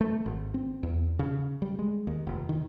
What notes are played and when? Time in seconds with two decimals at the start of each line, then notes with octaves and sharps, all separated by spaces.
0.01 A3
0.26 G#1
0.54 C4
0.83 E2
1.19 C#3
1.62 G3
1.79 G#3
2.07 D#2
2.27 F1
2.49 D#3